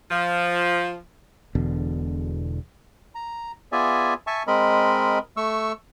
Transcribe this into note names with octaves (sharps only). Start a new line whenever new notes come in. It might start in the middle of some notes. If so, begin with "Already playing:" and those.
F3
E1 E2 B2 D3
A#5
B3 F4 G#4 D5 E5 G#5
E5 G#5 A5 C#6
G#3 C4 A#4 D#5 B5
A3 C#6 E6